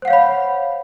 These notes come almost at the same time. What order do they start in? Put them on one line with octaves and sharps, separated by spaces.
C5 F#5 F5 C#5 B5